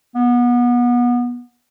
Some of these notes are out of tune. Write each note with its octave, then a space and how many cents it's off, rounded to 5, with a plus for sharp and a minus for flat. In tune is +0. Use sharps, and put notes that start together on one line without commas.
B3 -25